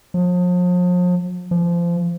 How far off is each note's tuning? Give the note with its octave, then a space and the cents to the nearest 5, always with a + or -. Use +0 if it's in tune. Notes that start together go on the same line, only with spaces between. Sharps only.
F3 +40
F3 -25